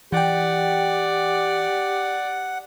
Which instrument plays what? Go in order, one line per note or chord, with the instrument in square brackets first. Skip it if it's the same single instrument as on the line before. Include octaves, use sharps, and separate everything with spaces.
[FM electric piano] E3 G5 [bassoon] G4 [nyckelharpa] D5 [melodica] F#5